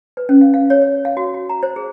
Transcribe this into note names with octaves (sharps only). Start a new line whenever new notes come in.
B4
C#4
F5
F5
C#5
C#5
F5
F#4
F#4
A#5
C5
G#4